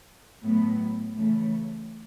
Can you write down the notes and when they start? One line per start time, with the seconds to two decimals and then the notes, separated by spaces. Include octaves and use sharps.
0.44 A2 F#3 B3
1.15 C#3 E3 A3